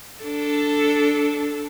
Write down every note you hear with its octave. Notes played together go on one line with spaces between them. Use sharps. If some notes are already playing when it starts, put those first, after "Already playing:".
D4 A4